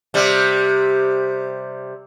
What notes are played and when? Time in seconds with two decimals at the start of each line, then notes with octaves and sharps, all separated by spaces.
0.14 C3 G3